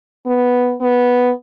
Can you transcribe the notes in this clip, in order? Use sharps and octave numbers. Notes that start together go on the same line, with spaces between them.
B3
B3